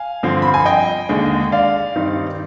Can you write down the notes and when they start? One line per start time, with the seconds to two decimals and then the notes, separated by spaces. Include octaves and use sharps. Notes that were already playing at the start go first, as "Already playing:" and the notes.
Already playing: F5 G#5
0.23 G2 D3 F3 C4
0.42 B5
0.54 G#5
0.66 D#5 G5
1.09 D#2 D3 G#3
1.52 D5 F5
1.95 G2 D#3 G3 C4 D#4